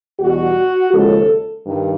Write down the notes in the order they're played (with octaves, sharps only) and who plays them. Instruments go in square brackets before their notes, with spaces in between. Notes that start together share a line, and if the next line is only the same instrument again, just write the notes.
[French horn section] E2 B2 G3 F#4
D#2 C#3 F3 G#3 A4
G2 D#3